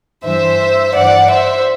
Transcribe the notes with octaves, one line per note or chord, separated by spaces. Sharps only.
G2 E3 C5 E5
G2 E3 D5 F#5
C5 E5